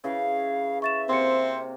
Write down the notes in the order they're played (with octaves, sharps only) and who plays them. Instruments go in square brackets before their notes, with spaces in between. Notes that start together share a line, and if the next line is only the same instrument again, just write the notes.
[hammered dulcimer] C#3 E3 [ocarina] F5
[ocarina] E5 [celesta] C#6 A6 E7
[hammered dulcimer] C3 A#3 A#5 [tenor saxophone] C4 [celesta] C6 C#7